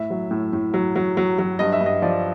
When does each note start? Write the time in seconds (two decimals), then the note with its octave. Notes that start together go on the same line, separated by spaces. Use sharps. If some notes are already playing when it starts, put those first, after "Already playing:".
Already playing: A2 E5
0.10 F#3
0.31 A2
0.53 A2
0.74 F#3
0.96 F#3
1.17 F#3
1.39 F#3
1.59 G2 D#5
1.73 E5
1.81 G2
1.86 D#5
2.02 F3 D5